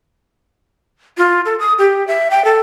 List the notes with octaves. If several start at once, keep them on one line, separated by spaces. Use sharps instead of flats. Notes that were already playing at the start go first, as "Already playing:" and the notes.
F4
A4
D#6
G4
E5
G5
A4